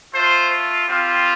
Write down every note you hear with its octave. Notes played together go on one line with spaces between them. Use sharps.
A3 F4 C5
G3 C4 F4